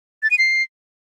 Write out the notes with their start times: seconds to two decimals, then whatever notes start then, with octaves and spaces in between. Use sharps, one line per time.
0.23 A6
0.31 D#7
0.38 C7